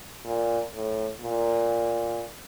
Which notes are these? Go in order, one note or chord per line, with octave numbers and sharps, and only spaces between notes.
A#2
A2
A#2